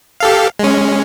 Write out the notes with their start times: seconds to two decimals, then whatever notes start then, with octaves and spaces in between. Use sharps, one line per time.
0.20 G4 A4 F5
0.59 G#3 C#4